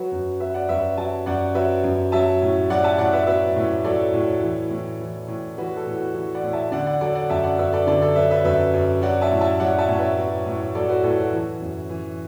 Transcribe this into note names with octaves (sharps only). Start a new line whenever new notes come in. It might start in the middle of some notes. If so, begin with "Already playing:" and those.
Already playing: F#3 F#4 B4
F#2
F#3 B4 E5
D5 F#5
F#2 B4 E5
F#3 E5 A5
F#2 D5 F#5
F#3 B4 E5
F#2
F#3 E5 A5
A2
F#3 D5 F#5
E5 A5
A2 D5 F#5
B4 E5
F#3 B4 E5
A2
F#3 A4 D5
A2
E3
A2
E3
A2
E3 F#4 B4
A4
A2
F#4
E3 F#4
D5 F#5
A2
E5 A5
D3 D5 F#5
D5 F#5
F#3 A4 D5
D5 F#5
F#2 E5 A5
D5 F#5
F#2 B4 E5
A4 D5
D3 A4 D5
A4 D5
F#3 B4 E5
B4 E5
F#2 B4 E5
F#2
F#3 D5 F#5
E5 A5
A2
E5 A5
F#3 D5 F#5
E5 A5
A2
B4 E5
F#3
A2
F#3 A4 D5
F#4 B4
A2 A4
F#4
E3
F#2
E3